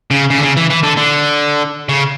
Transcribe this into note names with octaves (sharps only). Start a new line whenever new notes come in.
C#3
C#3
D3
C#3
E3
E3
D3
D3
C#3